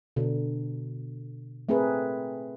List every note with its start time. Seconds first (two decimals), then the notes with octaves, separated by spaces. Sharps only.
0.16 B2 D3
1.69 A3 C4 G#4 A#4 B4